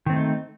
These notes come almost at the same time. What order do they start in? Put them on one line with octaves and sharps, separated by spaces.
D#3 C4 A3 D#4